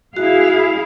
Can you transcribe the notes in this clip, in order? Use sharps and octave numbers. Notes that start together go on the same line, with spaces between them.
E4 F#4 G#4 F5